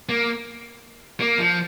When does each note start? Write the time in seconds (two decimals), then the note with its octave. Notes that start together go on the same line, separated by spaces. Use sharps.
0.09 A#3
1.20 A#3
1.38 F3